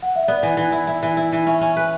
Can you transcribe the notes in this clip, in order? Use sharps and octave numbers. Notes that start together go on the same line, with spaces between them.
F#5
E5
B3 D5
E3
E3
E4
E4
E3
E4
E3
C#4 E5
C#4
B4